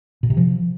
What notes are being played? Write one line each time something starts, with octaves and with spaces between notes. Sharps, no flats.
B2
C3
F3